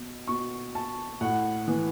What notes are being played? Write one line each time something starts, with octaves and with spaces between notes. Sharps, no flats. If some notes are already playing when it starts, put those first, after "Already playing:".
Already playing: B2
B2 C#6
A5
A2 F#5
E3